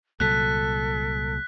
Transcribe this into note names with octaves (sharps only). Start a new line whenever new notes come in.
C2 A#2 F#3 A4 F#6 B6